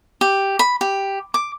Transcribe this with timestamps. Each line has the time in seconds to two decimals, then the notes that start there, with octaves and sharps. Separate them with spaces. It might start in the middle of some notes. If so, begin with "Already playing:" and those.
0.21 G4
0.59 B5
0.81 G4
1.34 D6